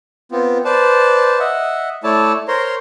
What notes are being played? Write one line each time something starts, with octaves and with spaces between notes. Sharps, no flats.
B3 C4 F4
B4 C5 D5 A5
D#5 E5 F#5
A3 E4 C#5 D5 A5
A#4 C5 C#5 A#5 C6